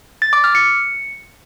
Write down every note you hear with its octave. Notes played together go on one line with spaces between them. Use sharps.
A6
D6
F6
C#7